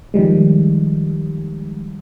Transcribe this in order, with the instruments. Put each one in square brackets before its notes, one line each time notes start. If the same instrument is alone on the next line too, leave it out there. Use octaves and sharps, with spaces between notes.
[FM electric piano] D#3 F3 G3 G#3